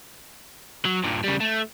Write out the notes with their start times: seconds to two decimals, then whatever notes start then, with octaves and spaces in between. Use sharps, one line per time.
0.85 F#3
1.04 G2 A#2
1.24 C#3 G3
1.40 A3